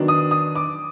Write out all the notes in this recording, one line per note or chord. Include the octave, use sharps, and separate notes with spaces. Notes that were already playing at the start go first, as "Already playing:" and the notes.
Already playing: D#3 F#3 B3 D4
D#6
D#6
D6